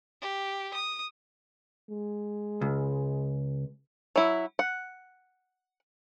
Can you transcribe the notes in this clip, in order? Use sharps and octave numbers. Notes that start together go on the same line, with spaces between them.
G4
D#6
G#3
C#2
F#3 E4
F#5